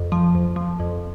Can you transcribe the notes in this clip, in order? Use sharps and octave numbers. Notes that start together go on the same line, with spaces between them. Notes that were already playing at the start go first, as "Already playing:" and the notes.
Already playing: F2
F3
F2
F3
F2